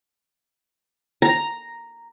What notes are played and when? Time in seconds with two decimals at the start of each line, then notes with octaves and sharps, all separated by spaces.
1.22 A#5